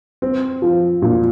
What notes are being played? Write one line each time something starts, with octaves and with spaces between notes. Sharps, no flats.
C4
F3
A#2